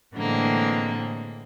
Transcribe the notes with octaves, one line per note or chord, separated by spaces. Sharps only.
A2 D3 E3 G#3 A#3 C4